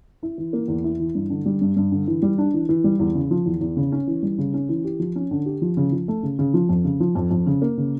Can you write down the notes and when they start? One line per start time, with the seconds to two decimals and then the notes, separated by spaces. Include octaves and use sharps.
0.23 E4
0.38 E3
0.53 A#3
0.68 E2
0.84 E4
0.99 E3
1.15 G2
1.30 D3
1.46 G3
1.61 G2
1.76 G2
1.92 D3
2.07 E3
2.22 G3
2.38 D4
2.54 E3
2.69 E3
2.84 G3
2.99 E2
3.15 C#3
3.31 F3
3.46 E2
3.61 E2
3.77 C#3
3.92 C#4
4.07 E3
4.23 G3
4.38 C#3
4.54 C#4
4.69 E3
4.84 G4
4.99 F3
5.16 C#4
5.31 D3
5.46 G4
5.62 F3
5.77 C#3
5.92 F3
6.08 A3
6.23 C#3
6.39 C#3
6.54 F3
6.69 F2
6.85 C#3
7.00 F3
7.15 F2
7.31 F2
7.47 C#3
7.62 A#3
7.78 C#3